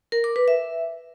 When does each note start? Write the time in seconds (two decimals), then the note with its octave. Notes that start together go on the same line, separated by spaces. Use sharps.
0.12 A#4
0.24 D6
0.36 B4
0.48 E5